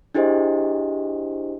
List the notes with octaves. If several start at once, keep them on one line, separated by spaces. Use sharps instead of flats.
D4 E4 G4 G#4 C5 D#5